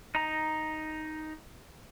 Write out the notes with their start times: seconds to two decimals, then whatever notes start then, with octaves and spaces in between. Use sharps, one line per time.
0.15 D#4 A#5